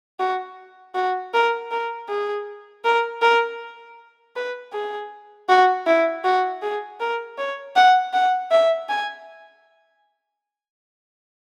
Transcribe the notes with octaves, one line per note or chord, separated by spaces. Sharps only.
F#4
F#4
A#4
A#4
G#4
A#4
A#4
B4
G#4
F#4
E4
F#4
G#4
A#4
C#5
F#5
F#5
E5
G#5